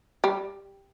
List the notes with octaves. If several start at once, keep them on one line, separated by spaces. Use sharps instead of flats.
G3